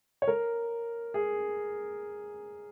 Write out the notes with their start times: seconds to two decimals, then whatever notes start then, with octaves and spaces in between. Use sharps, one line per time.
0.22 C#5
0.28 A#4
1.14 G#4